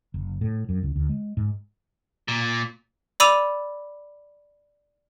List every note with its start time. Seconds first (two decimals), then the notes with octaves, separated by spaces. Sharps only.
0.14 F#1
0.41 A2
0.69 F#2
0.83 C#2
0.96 D2
1.09 G#3
1.37 G#2
2.28 A#2
3.20 D5 B5 D6 E6 D#7 F7